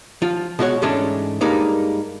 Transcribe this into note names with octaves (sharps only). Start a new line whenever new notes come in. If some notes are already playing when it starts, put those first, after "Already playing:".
F3 F4
B2 G#3 F#4 C#5
G#2 E3 G#3 A3 C#4 D4
G2 G3 G#3 A#3 D#4